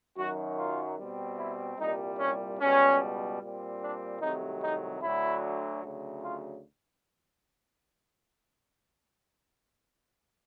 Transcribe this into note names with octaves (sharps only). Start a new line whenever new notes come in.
F#2 D#3 F#3 F#4
F4
B2 G3 C4
E4
C2 A#2 G3 D#4
C#4
C#2 B2 G3 C#4
A#2 G3 C4
D4
C2 C3 D#3 F#3 A3 D#4
D#4
D2 D3 F#3 E4
D2 C#3 F#3
F4